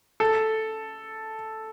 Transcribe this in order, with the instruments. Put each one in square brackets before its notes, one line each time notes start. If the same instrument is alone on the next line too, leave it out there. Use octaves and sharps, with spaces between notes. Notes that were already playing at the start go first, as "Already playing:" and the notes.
[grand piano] A4